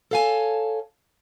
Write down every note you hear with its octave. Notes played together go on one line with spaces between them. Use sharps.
A4 C#5 F5 F#5 G#5 A5